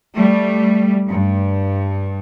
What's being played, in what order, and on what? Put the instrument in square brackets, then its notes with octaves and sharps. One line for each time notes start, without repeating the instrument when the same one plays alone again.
[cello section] G3 A3
G2